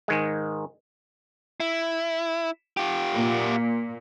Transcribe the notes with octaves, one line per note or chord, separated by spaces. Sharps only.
G#2 D#3 G#3
E4
F4 G4
A#2